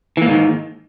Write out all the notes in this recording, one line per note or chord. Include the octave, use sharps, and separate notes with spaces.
G#2 D#3 E3 A#3